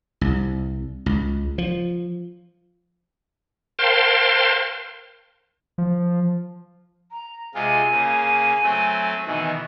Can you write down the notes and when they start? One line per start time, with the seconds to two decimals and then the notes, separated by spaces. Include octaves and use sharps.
0.21 C2
1.06 C#2
1.58 F3
3.79 A#4 C5 F5 G5 A5 C6
5.78 F3
7.10 A#5
7.54 C3 G#3 F4 G#5
7.91 C#3 A#3
8.63 F#3 A3 C4
9.26 B2 D#3 E3